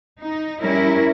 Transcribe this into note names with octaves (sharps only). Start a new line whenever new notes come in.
D#4
G3 C#4 E4 A#4